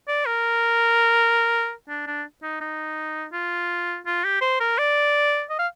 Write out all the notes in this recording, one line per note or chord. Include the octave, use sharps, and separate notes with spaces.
D5
A#4
D4
D4
D#4
D#4
F4
F4
G4
C5
A#4
D5
D#5
F5